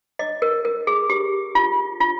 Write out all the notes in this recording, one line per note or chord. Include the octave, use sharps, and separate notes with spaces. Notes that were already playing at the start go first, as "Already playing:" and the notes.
D#5
A#4
A#4
G#4
G4
F4
F4